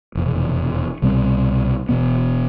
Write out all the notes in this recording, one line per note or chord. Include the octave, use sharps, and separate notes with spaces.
F1 E2 B2
C2 B2 G3 C4
E1 E2 B2 B3